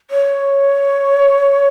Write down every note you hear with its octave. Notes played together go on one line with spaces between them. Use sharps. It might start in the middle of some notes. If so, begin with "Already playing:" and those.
C#5